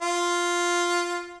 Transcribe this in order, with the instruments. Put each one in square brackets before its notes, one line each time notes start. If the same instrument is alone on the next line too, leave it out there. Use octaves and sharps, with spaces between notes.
[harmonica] F4